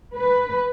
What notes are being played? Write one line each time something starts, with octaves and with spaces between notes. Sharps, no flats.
B4